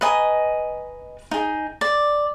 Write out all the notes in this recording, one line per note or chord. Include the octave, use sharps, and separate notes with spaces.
B4 D#5 G#5 A#5
D#4 G#4
D5